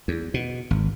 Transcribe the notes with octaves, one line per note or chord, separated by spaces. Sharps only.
E2
B2
G#1